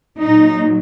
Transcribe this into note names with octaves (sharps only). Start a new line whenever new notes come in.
A#2 F#3 D#4